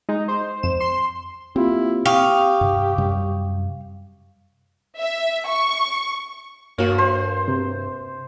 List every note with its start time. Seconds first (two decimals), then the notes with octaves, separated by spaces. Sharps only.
0.09 G#3 D#4
0.28 C5
0.63 F2 E7
0.80 C6
1.56 A#3 C4 E4 F4 G4
2.06 G4 F5 G5 C#6 D#6
2.61 G2 C3
2.98 F#2 C3 G3
4.98 E5
5.47 C#6
6.78 G2 A#3 F#4 C#5
6.98 C5 C6
7.48 C3